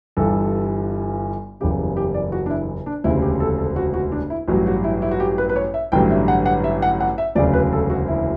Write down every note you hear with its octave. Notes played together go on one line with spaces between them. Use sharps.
G1 G2 E3 G3 A4
F#1 E2 C#3 G3 G4
G4
D5
F#4
D4
E4
D4
E1 D2 C#3 G3 E4
G4
A4
A4
F#4
F#4
D4
E4
A1 G2 F#3 F#4
F#4
E4
E4
F#4
G4
B4
B4
C#5
E5
A1 G2 D3 F#3 G5
E5
F#5
F#5
E5
F#5
F#5
E5
E1 D2 C#3 F#3 D5
B4
A4
F#4
E4